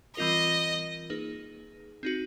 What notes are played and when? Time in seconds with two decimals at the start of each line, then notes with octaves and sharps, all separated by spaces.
0.17 E3 G3 C4 F4 A#4 D#5
1.10 A#3 D#4 G#4 B4
2.03 C4 D#4 F#4